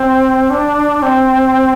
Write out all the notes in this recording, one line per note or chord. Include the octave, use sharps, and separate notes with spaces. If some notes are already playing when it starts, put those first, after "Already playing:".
Already playing: C4
D4
C4